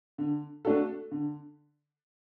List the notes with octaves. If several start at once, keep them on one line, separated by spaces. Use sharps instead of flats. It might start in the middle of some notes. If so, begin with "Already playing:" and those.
D3
A3 D4 F#4 A4
D3